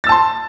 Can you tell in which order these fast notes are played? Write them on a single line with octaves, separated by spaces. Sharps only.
A6 E6 A5 C6